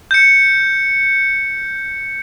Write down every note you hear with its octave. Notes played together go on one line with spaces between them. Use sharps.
G6 C#7